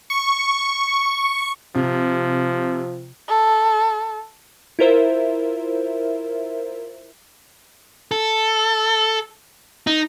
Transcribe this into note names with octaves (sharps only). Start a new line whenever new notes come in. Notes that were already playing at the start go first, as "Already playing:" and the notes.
C#6
C3 F3
A4
E4 F4 A#4 C5 E5
A4
D#4